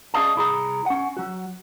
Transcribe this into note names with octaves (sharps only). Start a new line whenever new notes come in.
C#4 G#4 D5 D#5 F5 A5
C2 E4 G#4 A#5
C#4 F#5
F#3 F#4